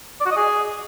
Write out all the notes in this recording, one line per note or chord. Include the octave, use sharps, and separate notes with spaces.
D5
F#4
D#5
G#4